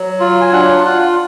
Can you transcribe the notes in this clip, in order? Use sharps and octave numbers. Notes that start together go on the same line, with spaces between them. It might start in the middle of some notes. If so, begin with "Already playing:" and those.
Already playing: F#3
F4
G#5
D4 F#5
F4